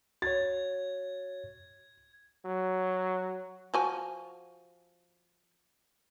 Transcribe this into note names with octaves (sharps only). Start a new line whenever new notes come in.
F#4 C#5 G#6 A6
F#3
F3 F#4 G#5